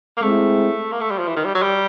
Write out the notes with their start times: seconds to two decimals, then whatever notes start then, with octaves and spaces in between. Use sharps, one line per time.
0.17 A#3
0.22 G#3 A3 C4 E4
0.92 A#3
1.01 A3
1.10 G3
1.19 F3
1.28 E3
1.36 D#3
1.45 G3
1.54 F#3
1.62 G3